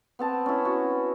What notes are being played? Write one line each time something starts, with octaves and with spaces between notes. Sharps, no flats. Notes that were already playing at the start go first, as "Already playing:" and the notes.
B3 C4 A5
C#4 E4
F#4